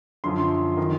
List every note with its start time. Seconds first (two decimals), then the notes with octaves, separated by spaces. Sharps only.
0.24 F#2 D3 F3 C6
0.77 D#3